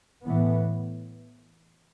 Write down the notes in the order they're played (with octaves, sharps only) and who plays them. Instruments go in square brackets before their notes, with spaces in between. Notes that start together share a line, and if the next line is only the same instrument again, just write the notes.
[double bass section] A2 E3 B3